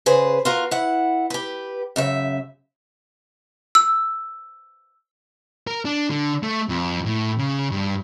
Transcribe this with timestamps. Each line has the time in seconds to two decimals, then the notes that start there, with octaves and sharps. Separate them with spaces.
0.06 C#3 G#4 B4 C5
0.45 F4 F#4 A#4
0.71 E4 F#5
1.30 G4 B4
1.96 F#2 C#3 E5
3.75 E6
5.67 A#4
5.85 D4
6.11 D3
6.43 A3
6.69 F2
7.06 A2
7.39 C#3
7.71 G2